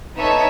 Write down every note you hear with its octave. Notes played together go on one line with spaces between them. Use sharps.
B3 D#4 A4 C#5 E5